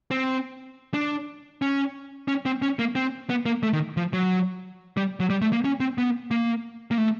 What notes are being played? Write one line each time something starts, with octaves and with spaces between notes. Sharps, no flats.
C4
D4
C#4
C#4
C4
C#4
A#3
C4
B3
A#3
A3
D#3
F3
F#3
G3
F#3
G3
A3
A#3
C#4
C4
B3
A#3
A#3
A3